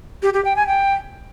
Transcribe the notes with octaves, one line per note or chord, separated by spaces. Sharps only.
G4
G4
G5
G#5
G5